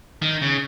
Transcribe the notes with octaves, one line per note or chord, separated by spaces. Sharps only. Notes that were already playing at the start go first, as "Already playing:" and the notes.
D#3
C#3